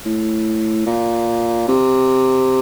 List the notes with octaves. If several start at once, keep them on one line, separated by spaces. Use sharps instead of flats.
A2
A#2
C3